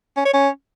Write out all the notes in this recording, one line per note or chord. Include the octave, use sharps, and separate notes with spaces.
C#4
C#5
C#4